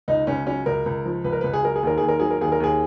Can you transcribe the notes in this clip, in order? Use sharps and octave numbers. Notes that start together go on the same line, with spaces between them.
C#2 D#4
C#2 C#4
F#3 C#4
C#2 A#4
C#2
F3
C#2 B4
A#4
C#2 B4
G#4
F#3 A#4
G#4
D#2 A#4
D#2 G#4
A#4
F#3 G#4
A#4
D#2 G#4
A#4
D#2 G#4